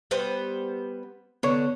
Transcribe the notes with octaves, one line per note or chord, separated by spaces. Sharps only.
G3 B3 C5
D3 B3 C#5